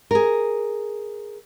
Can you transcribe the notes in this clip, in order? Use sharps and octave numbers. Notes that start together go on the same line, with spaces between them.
G#4 A#4